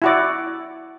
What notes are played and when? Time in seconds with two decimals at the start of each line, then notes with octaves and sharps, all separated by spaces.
0.02 E4 F#4 D5